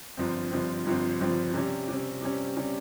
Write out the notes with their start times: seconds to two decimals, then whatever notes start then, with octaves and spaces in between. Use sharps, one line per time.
0.17 G1 G2 F3 C4
0.51 G1 G2 F3 C4
0.86 G1 G2 F3 C4
1.20 G1 G2 F3 C4
1.54 C3 G3 C#4
1.88 C3 G3 C#4
2.22 C3 G3 C#4
2.57 C3 G3 C#4